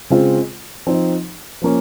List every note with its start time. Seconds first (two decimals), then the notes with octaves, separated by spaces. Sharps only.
0.10 C#3 G#3 C4 F4
0.87 F3 C4 D#4
1.62 F3 A#3 C#4